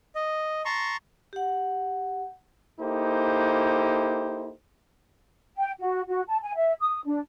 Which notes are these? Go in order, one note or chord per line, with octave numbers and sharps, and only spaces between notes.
D#5
A5 A#5 C6 C#6
G4 F#5
A#3 D#4 E4 G4 A4 C5
G5
F#4
F#4
A5
G#5
E5
D#6
D4